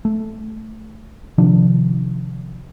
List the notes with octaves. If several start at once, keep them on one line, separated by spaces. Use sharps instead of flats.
A3
C3 D#3 F3 D4